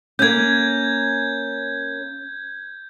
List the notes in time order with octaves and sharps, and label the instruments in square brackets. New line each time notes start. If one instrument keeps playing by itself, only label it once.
[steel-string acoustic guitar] A#3 C#4 [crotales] G6 G#6